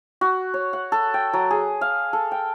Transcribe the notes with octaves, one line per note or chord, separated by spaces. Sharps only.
F#4
C#5
F#5
A4
G5
F#3
G#4
F5
A4
G5